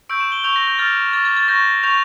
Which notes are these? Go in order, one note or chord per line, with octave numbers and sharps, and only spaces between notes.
C#6 E6 G6 D7
E7
G7
C#6 E6 G6 F7
A#6
G6
D6 F6 A6
D6 F6 A6
A6
A6
C#6 G6 A#6
C#6 G6 F7